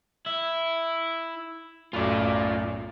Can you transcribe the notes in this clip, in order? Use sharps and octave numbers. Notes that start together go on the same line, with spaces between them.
E4
B1 F#2 A2 F4 D5